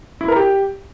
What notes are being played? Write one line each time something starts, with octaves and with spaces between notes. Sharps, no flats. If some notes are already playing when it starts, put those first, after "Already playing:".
E4
A#4
G4